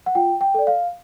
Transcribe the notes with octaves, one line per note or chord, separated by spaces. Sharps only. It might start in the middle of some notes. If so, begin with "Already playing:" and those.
F#5
F4 G5
G5
A4 D5
F5